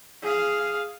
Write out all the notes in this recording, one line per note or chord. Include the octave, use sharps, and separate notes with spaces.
G#4 F5